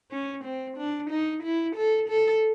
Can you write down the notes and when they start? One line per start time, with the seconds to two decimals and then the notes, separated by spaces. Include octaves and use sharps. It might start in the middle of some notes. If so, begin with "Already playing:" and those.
0.11 C#4
0.45 C4
0.77 D4
1.10 D#4
1.43 E4
1.76 A4
2.09 A4